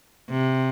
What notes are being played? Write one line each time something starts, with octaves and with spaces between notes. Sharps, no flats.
C3